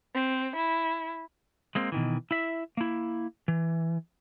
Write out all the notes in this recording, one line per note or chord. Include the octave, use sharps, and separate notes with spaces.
C4
E4
G#3 A#3 C4
B2 D#3 E3
E4 E5
A#3 E4
E3